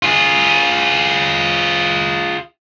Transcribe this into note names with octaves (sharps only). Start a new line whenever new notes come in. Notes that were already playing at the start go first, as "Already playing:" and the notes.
F4 G#4